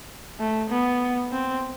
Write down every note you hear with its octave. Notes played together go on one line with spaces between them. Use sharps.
A3
B3
C4